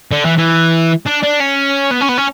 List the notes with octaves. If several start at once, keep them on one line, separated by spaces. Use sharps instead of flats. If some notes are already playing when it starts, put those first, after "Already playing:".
D3
E3
E3
D4
D4
C#4
B3
C#4
B3
C#4